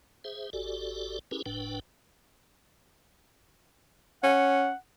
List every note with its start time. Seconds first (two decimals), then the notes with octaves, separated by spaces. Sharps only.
0.24 G#4 C5 E5
0.53 G#1 F#4 G4 A4 D5
1.31 C#4 E4 G4 G#4 A#4 B4
1.46 F#1 A2 D4 B4 G5
4.23 C#4 F#5